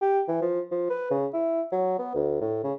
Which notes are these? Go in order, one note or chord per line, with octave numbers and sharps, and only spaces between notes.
G4
E3
F3
F3
B4
C#3
E4
F#3
B3
D2
A2
C#3